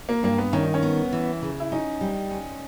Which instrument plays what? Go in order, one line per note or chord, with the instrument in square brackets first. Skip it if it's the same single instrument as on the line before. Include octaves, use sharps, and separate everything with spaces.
[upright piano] A#3
[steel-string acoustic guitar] G2 [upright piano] A#3
[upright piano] B3
[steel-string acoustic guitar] D#3 [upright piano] C#4
[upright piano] D#4
C#4
[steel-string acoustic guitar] B3
E3
C#3
[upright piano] E4
[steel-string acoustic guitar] C#4 [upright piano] D#4
[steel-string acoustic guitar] G3
C#4